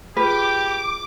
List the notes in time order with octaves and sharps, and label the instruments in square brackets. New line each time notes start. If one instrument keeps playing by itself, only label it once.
[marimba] F4 G#4 [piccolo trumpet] G4 [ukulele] B4 [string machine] D6